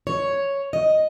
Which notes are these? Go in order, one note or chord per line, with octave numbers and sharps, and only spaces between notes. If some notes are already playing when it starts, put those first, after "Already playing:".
C#5
D#5